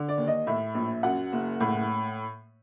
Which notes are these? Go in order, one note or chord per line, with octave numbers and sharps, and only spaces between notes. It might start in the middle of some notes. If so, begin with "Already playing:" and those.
Already playing: D3
D5
D#2
D#5
A2 E5
A#1
F#2 F#5
F#1
A2